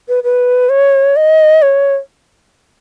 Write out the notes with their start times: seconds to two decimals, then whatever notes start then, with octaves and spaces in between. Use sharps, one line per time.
0.08 B4
0.24 B4
0.69 C#5
1.16 D#5
1.62 C#5